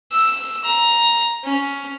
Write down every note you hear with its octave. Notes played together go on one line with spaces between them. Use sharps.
E6
A#5
C#4